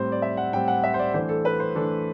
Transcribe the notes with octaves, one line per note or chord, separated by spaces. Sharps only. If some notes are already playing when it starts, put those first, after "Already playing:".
Already playing: A2 G3 C4 C5
D5
E5
F#5
A2 G3 C4 G5
F#5
E5
C5
D5
E3 A3 D4 C5
A4
B4
C5
E3 A3 D4 A4